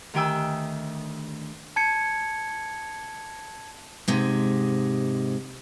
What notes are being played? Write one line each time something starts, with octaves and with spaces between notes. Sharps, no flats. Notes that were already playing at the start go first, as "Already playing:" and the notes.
D2 D#3 G4 G5 G#5 E6
A5 G#6 C#7
G#2 C3 G#3